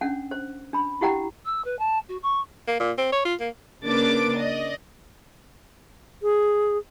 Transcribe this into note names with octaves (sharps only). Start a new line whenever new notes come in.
C#4 D4 F#5
C5
D4 B5
E4 G4 F#5 G5 A#5
E6
B4
A5
F#4
C#6
A#3
A#2
C4
C#5
F4
A#3
C#3 A#3 D4 B4 D6 A6
D5 D#5
G#4